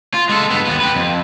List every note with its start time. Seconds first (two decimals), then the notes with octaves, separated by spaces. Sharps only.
0.14 F4
0.29 G#3 A4
0.50 G2 B3
0.65 D#2 B3
0.80 G4 B4
0.96 F2